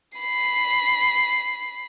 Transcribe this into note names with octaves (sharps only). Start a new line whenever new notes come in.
B5 C7